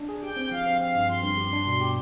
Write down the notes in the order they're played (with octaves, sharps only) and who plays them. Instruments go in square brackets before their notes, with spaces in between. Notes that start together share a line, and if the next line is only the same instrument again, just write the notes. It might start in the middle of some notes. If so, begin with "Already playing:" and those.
Already playing: [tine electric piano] D4
G#4
[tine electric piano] G4 [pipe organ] G5
[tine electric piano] C4
[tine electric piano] F3 [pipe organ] F5
[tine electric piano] C4
[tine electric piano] C4 [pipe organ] F5
[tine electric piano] G2
[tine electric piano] F3 [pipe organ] C6
[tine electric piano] G2
G4
D4
B2
G4